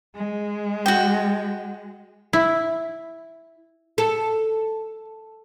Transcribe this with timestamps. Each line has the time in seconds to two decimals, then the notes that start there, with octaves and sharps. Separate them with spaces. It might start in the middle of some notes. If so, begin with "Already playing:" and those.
0.15 G#3
0.86 F#4 G5
2.33 E4
3.98 A4